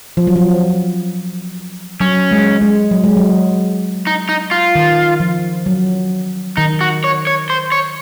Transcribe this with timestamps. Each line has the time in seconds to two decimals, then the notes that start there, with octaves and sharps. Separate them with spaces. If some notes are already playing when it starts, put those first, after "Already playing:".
0.17 F3
0.27 F#3
0.36 F3
2.00 F#3 C#4
2.32 G#3
2.61 G#3
2.91 F#3
3.04 G#3
3.17 F#3
4.07 D#4
4.29 D#4
4.51 F4
4.75 D#3
5.20 F3
5.66 F#3
6.57 D#3 D#4
6.81 F#4
7.04 C#5
7.27 C#5
7.50 C5
7.72 C#5